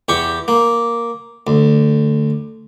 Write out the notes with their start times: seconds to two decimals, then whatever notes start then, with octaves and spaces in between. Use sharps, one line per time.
0.08 E2 G4 C#6
0.48 A#3
1.47 D2